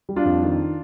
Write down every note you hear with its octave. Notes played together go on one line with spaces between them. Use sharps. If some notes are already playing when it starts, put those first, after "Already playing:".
G3
D4 F4
F2
D#3